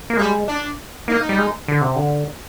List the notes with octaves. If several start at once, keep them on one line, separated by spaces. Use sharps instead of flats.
A#3
G3 G#3
D4
A#3 D#4
G3
G#3
D3
C3
D3